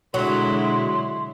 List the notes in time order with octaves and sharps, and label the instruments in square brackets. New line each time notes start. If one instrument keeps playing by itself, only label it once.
[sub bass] B2 [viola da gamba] D3 G#3 E4 [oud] F#3 [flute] C6